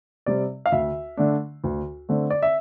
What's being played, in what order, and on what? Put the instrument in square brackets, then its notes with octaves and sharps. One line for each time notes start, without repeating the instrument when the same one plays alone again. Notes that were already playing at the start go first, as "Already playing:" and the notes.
[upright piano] C3 G3 C4 D5
F5
D2 E5
D3 A3 D4
D2
D3 A3 C4
D5
E5